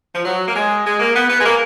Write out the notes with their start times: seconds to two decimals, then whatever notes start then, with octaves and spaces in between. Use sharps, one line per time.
0.15 F3
0.25 F#3
0.48 A#3
0.56 G#3
0.85 G#3
0.99 A#3
1.14 B3
1.30 B3
1.40 G#3
1.45 A#3